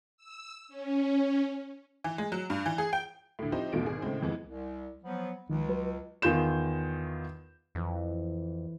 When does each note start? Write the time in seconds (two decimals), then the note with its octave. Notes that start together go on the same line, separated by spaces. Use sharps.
0.17 E6
0.68 C#4
2.04 E3
2.18 G#3
2.32 F#3
2.50 G2
2.66 E3
2.78 G#4
2.93 G5
3.39 D2 A2
3.52 F3 C4 D#4 E4 G4 C5
3.73 B1 E2 B2 A3 F4 D7
3.85 G#1 G#4
4.02 A2 C#3 G#3 C4
4.22 F2 E3 G#3 B3
4.47 C2
5.04 F3 F#3 B3
5.50 C#2 D#3 F3
5.69 F#3 B4
6.22 E2 D#3 F4 G6 E7
7.75 F2 E3